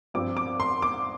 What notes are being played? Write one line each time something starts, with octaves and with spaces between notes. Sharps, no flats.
G2 F3 C4 D6
D6
C6
D6